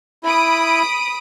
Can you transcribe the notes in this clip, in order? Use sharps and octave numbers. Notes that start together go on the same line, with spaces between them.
E4 B5 D#6 D7